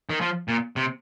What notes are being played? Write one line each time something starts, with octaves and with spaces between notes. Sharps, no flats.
D#3
F3
A#2
C3